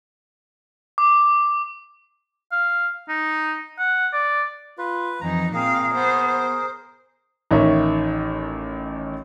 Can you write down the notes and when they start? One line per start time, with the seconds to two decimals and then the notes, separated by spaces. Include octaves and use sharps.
0.98 D6
2.52 F5
3.09 D#4
3.79 F#5
4.13 D5
4.78 F4 B4
5.21 F2 E3 D#4 A#5
5.54 A#2 C4 G#4 A#4 F5
5.95 B3 C5
6.29 C5
7.51 A1 D#3 D#4 C#5 E5